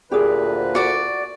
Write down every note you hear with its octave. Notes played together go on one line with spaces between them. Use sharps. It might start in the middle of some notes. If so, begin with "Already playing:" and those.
D2 A#2 G4 G#4 B4
F#4 D5